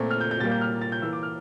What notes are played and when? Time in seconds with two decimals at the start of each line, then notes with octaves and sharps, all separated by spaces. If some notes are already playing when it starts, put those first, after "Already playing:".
Already playing: A#2 A3 C4
0.11 F6
0.21 G6
0.31 G6
0.40 A#2 G3 A#3 A6
0.51 G6
0.61 F6
0.81 A6
0.92 G6
1.02 E3 A#3 E6
1.13 D6
1.23 F6